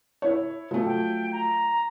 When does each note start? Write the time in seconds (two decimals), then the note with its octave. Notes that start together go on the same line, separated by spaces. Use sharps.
0.22 E4 C#5
0.71 F3 F#3 A3
0.85 G5
1.32 A#5